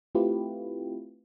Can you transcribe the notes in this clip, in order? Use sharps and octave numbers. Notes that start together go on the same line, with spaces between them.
A3 C4 E4 F4 G4 B4